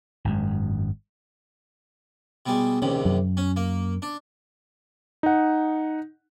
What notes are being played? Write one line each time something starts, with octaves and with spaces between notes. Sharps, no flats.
G#1 F#2 G#3
B2 G3 G#3
A#1 D#2 C3 C#4
F#2
C#4
A#3
D4
D#4 F#5